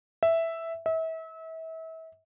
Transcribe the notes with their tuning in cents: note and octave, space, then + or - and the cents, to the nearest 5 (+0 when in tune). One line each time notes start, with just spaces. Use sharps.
E5 +0
E5 -35